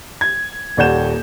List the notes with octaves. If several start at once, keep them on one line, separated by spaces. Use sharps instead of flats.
G#6
D#1 D#2 D5 F#5 G6 E7